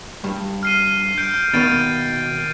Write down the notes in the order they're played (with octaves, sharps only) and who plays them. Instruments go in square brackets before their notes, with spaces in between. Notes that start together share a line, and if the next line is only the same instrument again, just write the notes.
[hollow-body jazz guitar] G2
[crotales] F6 C7 D#7
G6 D7
[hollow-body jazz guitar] B2 D#3 A#3 [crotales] A6 D7 D#7